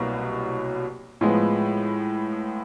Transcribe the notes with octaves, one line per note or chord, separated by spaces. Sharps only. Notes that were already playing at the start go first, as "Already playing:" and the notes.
Already playing: C2 B2 F#3 A#3
A2 F3 G#3 B3